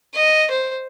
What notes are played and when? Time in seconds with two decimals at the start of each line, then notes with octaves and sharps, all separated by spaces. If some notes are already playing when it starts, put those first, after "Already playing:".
0.14 D#5
0.51 C5